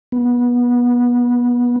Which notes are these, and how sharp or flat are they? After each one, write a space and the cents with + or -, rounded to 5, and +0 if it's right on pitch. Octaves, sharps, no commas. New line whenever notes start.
B3 -25